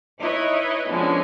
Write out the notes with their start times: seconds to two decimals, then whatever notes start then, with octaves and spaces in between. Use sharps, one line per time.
0.19 D#4 E4 B4 C#5 D#5
0.89 B2 D3 F3 G#3 C#4